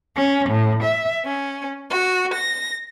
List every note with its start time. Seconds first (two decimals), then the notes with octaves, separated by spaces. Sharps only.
0.16 C#4
0.49 A2
0.82 E5
1.24 C#4
1.90 F#4
2.34 A#6